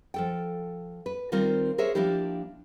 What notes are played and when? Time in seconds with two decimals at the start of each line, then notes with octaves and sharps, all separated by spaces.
0.14 F3 A4 G5
1.06 B4
1.32 D#3 G3 C4 F4 A#4 C5
1.78 G#4 A#4 C5 C#5 E5
1.95 F3 A#3 D4 E4 G4